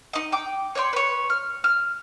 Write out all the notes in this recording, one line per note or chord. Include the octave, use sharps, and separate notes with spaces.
D#4 D#5
G5 D6
C#5 D5 G5 C6
B4 C#5
F6
F6